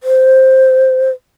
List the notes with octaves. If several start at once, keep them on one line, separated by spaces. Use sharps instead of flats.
C5